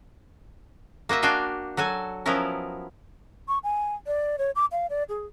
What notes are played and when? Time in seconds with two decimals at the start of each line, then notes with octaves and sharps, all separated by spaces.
1.09 A#3 F#4 D#5 E5
1.22 D4 F#4 F5 G5 G#5
1.77 F#3 F#4 A4 G#5
2.26 F3 F#3 B3 C#4 E4 A#4
3.48 C#6
3.64 G#5
4.07 D5
4.38 C#5
4.56 D6
4.72 F5
4.90 D5
5.09 G#4